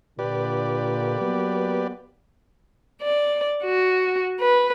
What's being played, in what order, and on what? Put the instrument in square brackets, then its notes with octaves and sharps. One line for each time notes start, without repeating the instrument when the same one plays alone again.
[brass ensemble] A#2 D3 [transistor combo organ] G4 B4 D5
[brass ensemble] F#3 A#3 B3
[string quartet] D5
F#4
B4